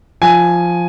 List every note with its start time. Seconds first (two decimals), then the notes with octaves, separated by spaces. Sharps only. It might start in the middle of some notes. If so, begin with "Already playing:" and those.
0.22 F3 G#5